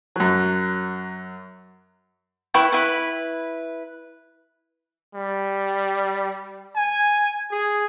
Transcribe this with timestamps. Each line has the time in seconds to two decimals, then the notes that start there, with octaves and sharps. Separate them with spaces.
0.16 F#2 F#3
2.54 E4 B4 G5 C#6
2.72 E4 B4
5.15 G3
6.75 G#5
7.52 G#4